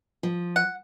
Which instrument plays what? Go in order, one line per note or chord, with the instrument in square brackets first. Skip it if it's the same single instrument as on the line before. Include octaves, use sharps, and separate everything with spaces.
[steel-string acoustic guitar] F3
[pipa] F#5